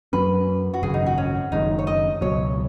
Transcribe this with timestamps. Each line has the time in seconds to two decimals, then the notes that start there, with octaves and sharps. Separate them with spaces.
0.13 F#2 F#3 C#4 B4
0.74 F#4
0.82 G#1 F#2 C#3 G#4
0.94 D#4
1.06 F#4
1.18 C#4
1.52 F#1 F#2 D#3 G#3 D#4
1.79 C#5
1.87 D#5
2.21 C#2 B2 F#3 C#5